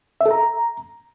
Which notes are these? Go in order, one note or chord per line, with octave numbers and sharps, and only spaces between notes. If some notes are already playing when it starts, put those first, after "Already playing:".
E5
A4
A#5